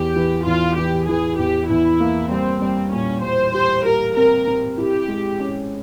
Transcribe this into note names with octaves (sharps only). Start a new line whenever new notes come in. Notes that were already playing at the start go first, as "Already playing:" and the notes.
Already playing: E2 G4
E3
E2 F4
E3 G4
E3 G#4
E2 G4
E2 E4
A#3
G3 C4
G3 C4
A#2 C#4
G3 C5
G4 C5
G4 A#4
C4 A#4
C4
E4 G4
G#3
C#4